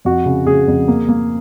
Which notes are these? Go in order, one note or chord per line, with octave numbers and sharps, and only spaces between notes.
F2 F#4
C#3
C#3 G#4
F2
A#3
A#3